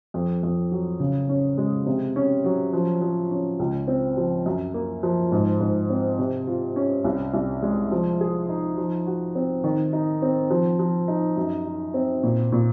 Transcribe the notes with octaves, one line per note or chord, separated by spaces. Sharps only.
F2
F2
F#3
C#3
C#4
G#3
C3
C#4
F#3
F3
F3
C#4
C#2
C4
F3
F#2
A#3
F3
G#2
G#2
C4
C3
F4
C#4
C2
C2
G#3
F3
G#4
D#4
F3
F#4
C4
D#3
D#4
C4
F3
F3
D#4
F#2
D#4
C4
A#2
A#2